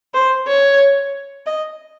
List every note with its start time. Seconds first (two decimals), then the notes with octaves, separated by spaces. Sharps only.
0.14 C5
0.47 C#5
1.46 D#5